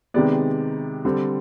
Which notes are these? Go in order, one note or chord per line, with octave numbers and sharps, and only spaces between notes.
C3 D#3 G#3 B3 D5
D3 G3 C4